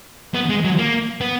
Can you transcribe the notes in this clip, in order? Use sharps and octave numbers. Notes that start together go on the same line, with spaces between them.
B3
G#3
F#3
A#3
B3